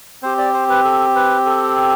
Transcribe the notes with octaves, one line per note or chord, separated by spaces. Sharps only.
C4 G4 C5
D5
C5
B4
A4
B4
A4